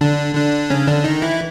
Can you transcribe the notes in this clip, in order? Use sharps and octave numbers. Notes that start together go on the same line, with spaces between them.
D3 D4
D3 D4
C#3 C#4
D3 D4
D#3 D#4
E3 E4